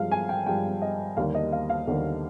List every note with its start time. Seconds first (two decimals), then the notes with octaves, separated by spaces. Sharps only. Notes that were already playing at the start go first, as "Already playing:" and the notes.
Already playing: G2 F3 G#3 F5
0.11 G#5
0.29 G5
0.46 G2 F3 G#3 G5
0.82 D#5
1.17 D#2 D3 G3 A#3 F5
1.35 D#5
1.52 F5
1.70 F5
1.87 D#2 D3 G3 A#3